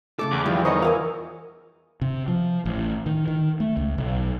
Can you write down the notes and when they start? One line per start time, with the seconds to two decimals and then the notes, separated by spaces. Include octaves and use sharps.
0.19 C#3 A3 A4 A5 D6
0.32 E2
0.46 D3 D#3 F3 G3
0.65 D#4 A#4 C5 C#5 D#5 F#5
0.82 E3 F4 A#4 F5 F#5 G#5
2.01 C3
2.28 F3
2.66 A1
3.06 D#3
3.28 D#3
3.60 A3
3.77 C#2
3.98 B1